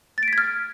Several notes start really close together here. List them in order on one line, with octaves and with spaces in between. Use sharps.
A6 D7 B6 G#6 F6